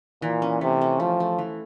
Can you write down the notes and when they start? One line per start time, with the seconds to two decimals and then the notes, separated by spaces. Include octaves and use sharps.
0.22 A#2 E3
0.42 C#4
0.61 C3 A3
0.81 C#4
1.00 F3 A3
1.20 A3
1.38 E3